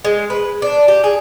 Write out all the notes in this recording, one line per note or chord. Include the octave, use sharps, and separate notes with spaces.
G#3
B4
D4
G4
G#4